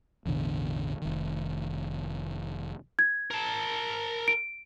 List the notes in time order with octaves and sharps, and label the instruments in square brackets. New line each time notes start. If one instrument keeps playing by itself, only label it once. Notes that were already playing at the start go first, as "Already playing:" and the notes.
[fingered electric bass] A1 E2 B2 D3
F1 D#3
[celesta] G#6
[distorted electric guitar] A#4 A5
[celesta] D7